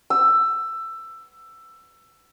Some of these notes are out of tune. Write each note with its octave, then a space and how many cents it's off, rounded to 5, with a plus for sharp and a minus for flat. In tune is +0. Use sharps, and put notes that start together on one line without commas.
E6 +15